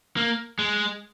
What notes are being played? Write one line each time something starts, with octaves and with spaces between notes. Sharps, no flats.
A#3
G#3